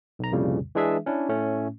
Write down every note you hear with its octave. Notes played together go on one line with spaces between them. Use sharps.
B1 A#5
C2 F2 A#2 C#3 G3
E3 G#3 D4 G#4 E5
C#4 D4 E4
A2 A3 C#4